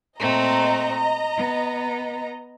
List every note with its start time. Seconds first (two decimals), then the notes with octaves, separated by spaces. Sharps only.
0.19 A#2 A3 C4 D#5 A#5
1.36 B3